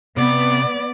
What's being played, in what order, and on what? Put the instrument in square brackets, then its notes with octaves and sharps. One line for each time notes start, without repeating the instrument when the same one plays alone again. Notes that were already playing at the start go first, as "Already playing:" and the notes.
[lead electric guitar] C3 [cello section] B3 [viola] D5